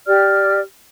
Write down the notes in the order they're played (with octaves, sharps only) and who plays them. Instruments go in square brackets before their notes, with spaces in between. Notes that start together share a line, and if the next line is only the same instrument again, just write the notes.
[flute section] G4 D5 F6